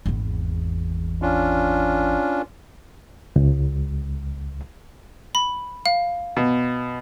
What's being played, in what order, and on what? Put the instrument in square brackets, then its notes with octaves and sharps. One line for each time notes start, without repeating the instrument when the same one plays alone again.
[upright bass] G#1 E2
[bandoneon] C#4 D4 F4
[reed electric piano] C#2
[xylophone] B5
F5
[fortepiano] B2